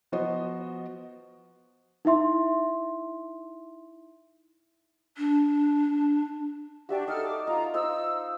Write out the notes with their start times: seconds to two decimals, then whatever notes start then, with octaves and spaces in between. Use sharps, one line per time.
0.12 F3 B3 F#4 C5 D#5
2.05 D#4 E4 E5 C6
5.17 D4
6.89 D4 F#4 G4 E5 A5
7.08 D#4 A4 F6
7.26 D6
7.47 D#4 F4 A#5
7.74 D#4 F4 C5 E6